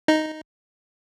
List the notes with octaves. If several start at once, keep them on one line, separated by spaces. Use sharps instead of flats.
D#4